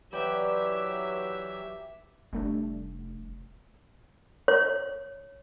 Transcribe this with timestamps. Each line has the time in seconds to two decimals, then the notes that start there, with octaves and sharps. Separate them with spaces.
0.13 E3 F#3 G4 B4 D5 E5 G5
2.33 F1 G3 A3 D4
4.48 C#5